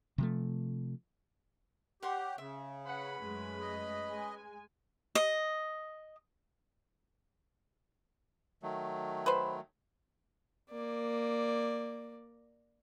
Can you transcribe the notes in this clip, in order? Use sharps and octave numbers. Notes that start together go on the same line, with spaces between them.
C3 F3 A3
G4 C#5 F#5 C6
C#3 E5
C#4 B4 F#5 B5
F#2 G#3 A3
D#5
G#3 G#5
D#5
D#3 F#3 A3
B4 C5
A#3 D5